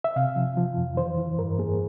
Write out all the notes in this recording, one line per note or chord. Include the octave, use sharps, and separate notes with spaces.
E5
C3 F5
F3
F3
F2
E3 C5
E3
G2 A#4
A#3 G#4